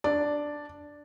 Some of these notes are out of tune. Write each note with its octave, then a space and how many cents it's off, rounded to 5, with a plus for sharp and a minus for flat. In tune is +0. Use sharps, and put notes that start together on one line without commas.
D4 +0 D5 +0